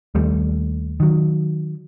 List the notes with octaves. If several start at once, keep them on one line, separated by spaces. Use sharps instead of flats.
D#2 G3 A3
D#3 F#3